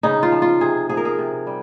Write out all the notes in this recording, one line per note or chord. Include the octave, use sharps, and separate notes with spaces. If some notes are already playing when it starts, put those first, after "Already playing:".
C#3 D#4
F4
F3
F4
C3 G#4
F3 G#4
A#4
G#4
C3
G3